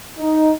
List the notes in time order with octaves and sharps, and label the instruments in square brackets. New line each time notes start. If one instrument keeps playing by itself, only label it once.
[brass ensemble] D#4